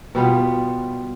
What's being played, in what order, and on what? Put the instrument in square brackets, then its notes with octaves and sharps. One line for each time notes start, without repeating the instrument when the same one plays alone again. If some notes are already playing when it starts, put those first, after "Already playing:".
[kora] B2 G3 B3 F4